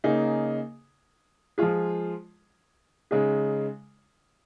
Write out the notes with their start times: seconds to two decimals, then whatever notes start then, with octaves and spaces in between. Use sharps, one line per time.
0.04 C#3 A#3 D#4 G#4
1.58 F3 G#3 F4 G#4
3.11 C#3 G#3 D#4 G#4